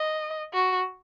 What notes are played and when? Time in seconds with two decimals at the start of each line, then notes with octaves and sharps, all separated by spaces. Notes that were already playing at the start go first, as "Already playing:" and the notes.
Already playing: D#5
0.54 F#4